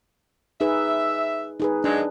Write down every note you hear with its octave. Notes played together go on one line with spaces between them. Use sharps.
D#4 G#4 B4 E5
D#4 G#4 B4
F#2 G#3 D4